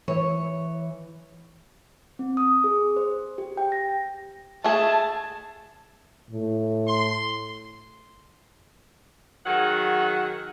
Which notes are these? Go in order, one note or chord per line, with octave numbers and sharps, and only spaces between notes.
E3 C#5
C4
D#6
G#4
C5
G4
G5
A#6
A3 G#4 A5
A2
C6
D#3 F#3 G#4 F#5